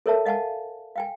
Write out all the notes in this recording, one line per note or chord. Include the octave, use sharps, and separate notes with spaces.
A4 A#4 C#5 E5 A5
D#5 F5 F#5 G#5 A5
F5 G5 G#5